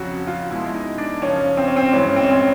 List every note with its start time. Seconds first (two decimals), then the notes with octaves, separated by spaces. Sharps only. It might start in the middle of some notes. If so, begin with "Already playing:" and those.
Already playing: F2 C#3 F#3 F#4
0.27 F4
0.51 B2 G#3 E4
0.74 D#4
0.98 D4
1.22 F#2 C#3 F3 C#4
1.57 C4
1.67 C#4
1.76 C4
1.93 G2 E3 G#3 C#4
2.16 C4
2.24 C#4
2.31 C4